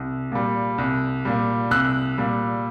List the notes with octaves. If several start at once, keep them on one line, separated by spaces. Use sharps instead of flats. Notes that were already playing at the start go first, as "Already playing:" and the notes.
Already playing: C2
A#2 G3
C2
A#2 G3
C2 E6 F#6
A#2 G3